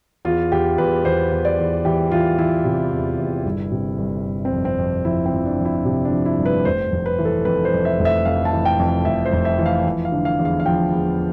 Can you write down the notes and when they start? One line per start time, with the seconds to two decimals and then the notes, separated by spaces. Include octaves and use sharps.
0.25 E2 F4
0.52 E2 G4
0.78 E2 B4
1.05 E2 C5
1.32 E2
1.45 D5
1.58 E2
1.85 E3 G4
2.11 E3 F4
2.39 E3 E4
2.65 C3
2.92 E2
3.18 E2
3.45 G1
3.72 C3
3.98 G1
4.25 G1
4.45 C4
4.52 F2
4.65 C4
4.78 F2
5.05 F3 E4
5.26 C4
5.32 F3
5.45 D4
5.59 F3
5.65 E4
5.85 C3
6.05 D4
6.12 F3
6.26 E4
6.38 G1
6.46 B4
6.65 F1 C5
6.92 F1
7.06 B4
7.19 E3
7.25 A4
7.45 F2 B4
7.65 C5
7.73 F2
7.85 E5
7.99 F1
8.05 E5
8.25 F2 F5
8.45 A5
8.52 E3
8.65 G5
8.79 F2
9.05 F1 E5
9.25 C5
9.32 F1
9.45 E5
9.59 E3
9.66 F5
9.85 F3
10.05 F5
10.12 D3
10.25 F5
10.39 E2
10.45 F5
10.60 F5
10.66 F3 G5
10.92 E2